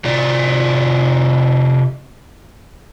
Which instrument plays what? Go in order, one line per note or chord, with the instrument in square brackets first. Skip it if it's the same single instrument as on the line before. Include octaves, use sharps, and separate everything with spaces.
[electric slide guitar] C3 F4 D5